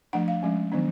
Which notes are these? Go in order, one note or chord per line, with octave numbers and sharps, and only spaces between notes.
F3 A3 D4 F#5
F5
F3 G#3 C#4
D#3 F#3 B3 D4